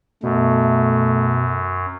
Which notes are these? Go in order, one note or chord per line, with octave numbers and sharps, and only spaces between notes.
F#2 B2 A3